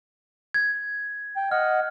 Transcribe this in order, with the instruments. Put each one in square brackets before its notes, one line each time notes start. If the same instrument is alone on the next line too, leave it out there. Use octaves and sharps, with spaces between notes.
[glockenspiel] G#6
[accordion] G5
[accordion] D#5 F#5 [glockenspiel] F6